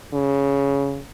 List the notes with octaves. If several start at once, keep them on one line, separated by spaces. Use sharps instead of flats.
C#3